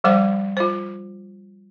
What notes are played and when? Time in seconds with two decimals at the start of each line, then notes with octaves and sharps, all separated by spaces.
0.04 F3 G3 C5 F#5 D6
0.57 F4 C5